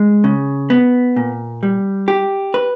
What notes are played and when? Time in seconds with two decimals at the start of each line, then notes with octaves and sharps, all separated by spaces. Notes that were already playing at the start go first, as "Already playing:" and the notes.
Already playing: G#3
0.24 C#3
0.70 B3
1.16 A#2
1.63 G3
2.08 G4
2.54 B4